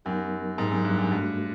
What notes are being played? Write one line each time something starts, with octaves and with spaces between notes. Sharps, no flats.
F#2 F#3 B3 D#4 G4 A#4
G#2 F#3 B3 D#4 G4 A#4
F#2
G2
F#2
G2 A3 D4 F#4 A4